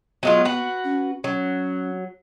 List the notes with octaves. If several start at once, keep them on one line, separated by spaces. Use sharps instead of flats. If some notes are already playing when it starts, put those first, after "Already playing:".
F#3 G#3 B3 F4
F#4 B4
C#4
F#3 C#4